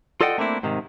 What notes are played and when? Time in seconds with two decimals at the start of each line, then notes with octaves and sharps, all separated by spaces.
0.21 F4 A4 D5 D#5 F#5 G5
0.38 A3 A#3 C4 D4 E4
0.63 G#2 C3 D#3